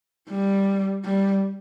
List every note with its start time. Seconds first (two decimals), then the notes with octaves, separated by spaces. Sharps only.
0.30 G3
1.04 G3